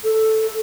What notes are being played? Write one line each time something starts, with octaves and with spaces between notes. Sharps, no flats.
A4